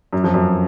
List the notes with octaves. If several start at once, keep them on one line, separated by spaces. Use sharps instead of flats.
F#2
F2
F#2